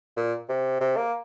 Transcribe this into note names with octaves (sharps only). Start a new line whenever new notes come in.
A#2
C3
C3
A#3